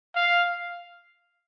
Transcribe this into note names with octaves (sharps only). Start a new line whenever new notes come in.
F5